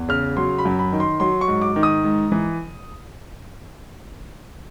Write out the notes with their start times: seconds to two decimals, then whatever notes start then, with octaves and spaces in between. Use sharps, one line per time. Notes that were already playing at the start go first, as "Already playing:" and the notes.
Already playing: E2
0.09 C#3 F6
0.37 F#3 C6
0.58 B5
0.65 F#2
0.79 B5
0.92 D#3
1.00 C6
1.20 F#3 C6
1.41 C#6
1.48 G#2
1.62 D6
1.76 D#3
1.83 D#6
2.04 G#2
2.32 E3